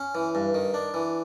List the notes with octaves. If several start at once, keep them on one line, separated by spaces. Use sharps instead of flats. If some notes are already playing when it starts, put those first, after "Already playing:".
Already playing: C#4
E3
G2
D#3
D4
E3